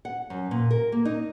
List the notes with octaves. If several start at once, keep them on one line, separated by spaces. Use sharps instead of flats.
F#5
F#2
A#2
A#4
A#3
D#4